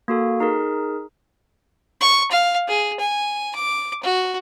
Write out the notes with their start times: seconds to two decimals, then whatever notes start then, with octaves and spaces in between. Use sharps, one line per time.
0.08 A#3 F#4 A4
0.40 D#4 G#4 A#4
2.01 C#6
2.31 F5
2.68 G#4
3.00 G#5
3.55 D6
4.03 F#4